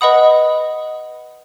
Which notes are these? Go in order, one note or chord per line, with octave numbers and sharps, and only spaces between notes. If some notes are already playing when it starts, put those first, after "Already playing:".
B4 D#5 F#5 B5 D#6